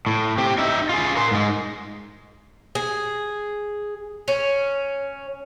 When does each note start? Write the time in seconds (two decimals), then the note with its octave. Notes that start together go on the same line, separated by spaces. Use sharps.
0.07 A2
0.38 C4 G4
0.58 D#4 E5
0.89 F4 G#4
1.17 A#4 C6
1.31 G#2 G#3
2.75 G#4
4.28 C#4